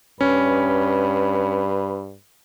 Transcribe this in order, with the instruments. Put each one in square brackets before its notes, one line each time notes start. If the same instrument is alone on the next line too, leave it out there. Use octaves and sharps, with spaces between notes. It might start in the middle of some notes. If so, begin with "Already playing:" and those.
[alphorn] G2 [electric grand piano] C#4 [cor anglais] B4